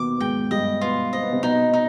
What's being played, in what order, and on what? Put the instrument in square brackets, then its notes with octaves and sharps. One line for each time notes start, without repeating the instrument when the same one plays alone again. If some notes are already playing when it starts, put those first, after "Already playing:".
Already playing: [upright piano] D#2 B2 D#3 B3 [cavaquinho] D6
[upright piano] B3
[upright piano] G#2 G#3 [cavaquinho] G5
[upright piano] G2 G3 [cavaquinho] D#5
[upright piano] B2 B3 [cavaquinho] F4
[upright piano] C4 [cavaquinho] D#5
[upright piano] B3
C3 C4
[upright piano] B2 B3 [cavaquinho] D#4
[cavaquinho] D#4